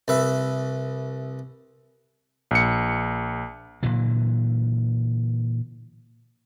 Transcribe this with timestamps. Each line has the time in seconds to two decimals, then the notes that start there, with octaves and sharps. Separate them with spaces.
0.08 C2 B4 E5
2.51 A#1 C#7
3.83 A#2 D3 E3 F#3